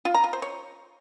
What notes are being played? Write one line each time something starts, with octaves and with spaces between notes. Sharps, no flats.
F4
A#5
F4
C5
C#5